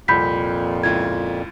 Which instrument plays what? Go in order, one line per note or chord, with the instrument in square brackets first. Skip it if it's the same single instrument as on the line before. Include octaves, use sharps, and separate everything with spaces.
[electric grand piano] C2 [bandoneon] F2 A#2 [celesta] B5 G6 B6
[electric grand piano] C#2 E4 F4 [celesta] G#6